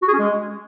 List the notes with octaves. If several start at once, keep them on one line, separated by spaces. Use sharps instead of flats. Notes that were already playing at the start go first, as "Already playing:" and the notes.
F#4
G#4
C#4
G#3